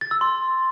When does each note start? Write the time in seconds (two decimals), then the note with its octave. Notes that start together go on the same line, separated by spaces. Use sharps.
0.01 A6
0.11 E6
0.21 C6